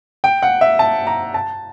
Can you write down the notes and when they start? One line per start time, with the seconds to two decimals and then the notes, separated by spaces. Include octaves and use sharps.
0.24 G5
0.42 F#5
0.61 E5
0.79 A5
1.07 A#5
1.34 A5